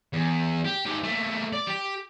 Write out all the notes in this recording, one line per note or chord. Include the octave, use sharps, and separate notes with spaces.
E2
G4
G#2 G4
A3 A#3
D5
G4